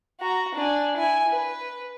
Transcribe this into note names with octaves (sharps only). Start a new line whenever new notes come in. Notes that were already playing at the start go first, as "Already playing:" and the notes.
F#4 A#5
D4 G#5
E4 G#5
B4